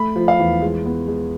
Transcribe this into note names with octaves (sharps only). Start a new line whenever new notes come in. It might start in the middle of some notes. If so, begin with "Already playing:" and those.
Already playing: A3 B5
F3
F5
E2
G#3
B3
G#3